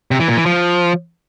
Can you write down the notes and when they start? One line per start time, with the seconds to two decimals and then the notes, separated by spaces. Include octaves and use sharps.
0.11 C3
0.20 E3
0.28 A#2
0.37 E3
0.46 F3